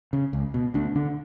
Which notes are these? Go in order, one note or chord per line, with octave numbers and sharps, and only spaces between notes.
C#3
C#2
B2
D2 D4
D3 D4